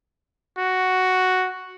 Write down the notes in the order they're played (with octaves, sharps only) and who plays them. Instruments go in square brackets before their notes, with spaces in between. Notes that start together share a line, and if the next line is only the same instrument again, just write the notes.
[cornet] F#4